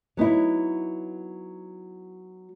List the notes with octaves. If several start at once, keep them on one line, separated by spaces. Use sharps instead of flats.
F#3 B3 D#4 E4